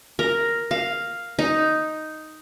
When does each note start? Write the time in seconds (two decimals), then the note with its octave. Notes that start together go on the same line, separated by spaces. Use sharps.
0.19 A#4
0.71 F5
1.39 D#4